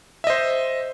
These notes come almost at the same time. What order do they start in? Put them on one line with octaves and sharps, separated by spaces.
E5 D#5 C5